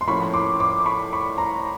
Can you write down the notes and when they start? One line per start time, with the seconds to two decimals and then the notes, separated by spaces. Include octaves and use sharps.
0.01 C6
0.07 A2 F3 A#3 C#4 B5 C#6
0.33 C6 D6
0.60 C6 D6
0.86 B5 C#6
1.13 B5 C#6
1.38 A#5 C6